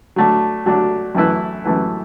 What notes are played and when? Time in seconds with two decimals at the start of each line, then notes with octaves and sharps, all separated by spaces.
0.16 F#3 A3 D4
0.66 F#3 A3 D4
1.15 F#2 E3 A3 E4 B4
1.65 F#2 E3 A3 E4 B4